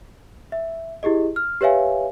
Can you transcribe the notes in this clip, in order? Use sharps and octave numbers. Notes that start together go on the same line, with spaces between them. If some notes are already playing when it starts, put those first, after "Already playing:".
E5
E4 G4 G#4 D#5
F6
G4 B4 C#5 E5 F5 G#5